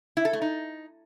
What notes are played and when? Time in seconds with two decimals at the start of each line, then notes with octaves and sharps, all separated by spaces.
0.17 E4
0.25 A4
0.33 A3
0.42 D#4